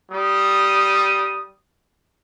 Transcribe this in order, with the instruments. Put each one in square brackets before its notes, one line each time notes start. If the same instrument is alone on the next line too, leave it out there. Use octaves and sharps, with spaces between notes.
[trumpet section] G3 D#6